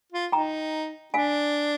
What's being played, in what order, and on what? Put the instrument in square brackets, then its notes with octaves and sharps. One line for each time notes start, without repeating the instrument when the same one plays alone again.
[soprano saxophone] F4
[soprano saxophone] D#4 [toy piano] G5 A#5
[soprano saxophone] D4 [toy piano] F5 G#5